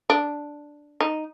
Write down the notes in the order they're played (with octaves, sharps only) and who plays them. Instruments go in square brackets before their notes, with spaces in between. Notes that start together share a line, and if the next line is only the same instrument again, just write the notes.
[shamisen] D4
D#4